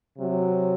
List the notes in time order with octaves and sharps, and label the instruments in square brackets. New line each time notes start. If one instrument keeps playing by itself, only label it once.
[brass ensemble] C3 F#3